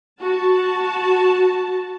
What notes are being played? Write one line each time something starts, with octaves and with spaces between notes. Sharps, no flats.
F#4 A5